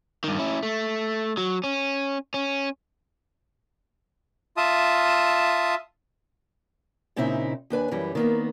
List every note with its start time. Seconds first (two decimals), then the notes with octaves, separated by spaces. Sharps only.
0.24 G2 D#3
0.39 C#4 E4
0.63 A3
1.37 F#3
1.64 C#4
2.34 C#4
4.57 F4 E5 A5 D#6
7.16 A#2 C#3 C4 D#4 E4 E5
7.70 D#2 D4 B4 G#5
7.91 F#2 E3 G3
8.15 D#3 A#3 B3